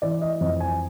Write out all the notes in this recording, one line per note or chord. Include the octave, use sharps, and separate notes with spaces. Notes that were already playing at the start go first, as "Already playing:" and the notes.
E3 D5
D#5
F2 D#5
G#5